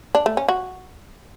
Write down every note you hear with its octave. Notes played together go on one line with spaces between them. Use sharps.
D4
A3
C#4
F#4